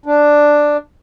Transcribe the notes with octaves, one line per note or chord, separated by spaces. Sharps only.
D4